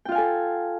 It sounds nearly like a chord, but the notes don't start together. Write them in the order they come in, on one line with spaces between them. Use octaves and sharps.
G5 F4 F5 G#5 A4